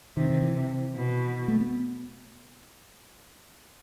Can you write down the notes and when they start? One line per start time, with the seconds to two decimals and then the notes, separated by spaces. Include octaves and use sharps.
0.17 C3 D#3
0.30 D#3
0.42 E3
0.56 C3
0.95 B2
1.48 A3
1.61 B3